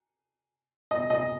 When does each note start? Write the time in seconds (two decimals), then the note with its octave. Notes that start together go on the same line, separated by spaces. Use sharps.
0.91 D#5
1.10 D#5